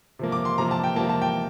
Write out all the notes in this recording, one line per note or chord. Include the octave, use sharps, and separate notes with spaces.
C3 F3 A#3
D6
C6
C3 F3 A#3 A#5
A5
G5
C3 F3 A#3 A5
A5
G5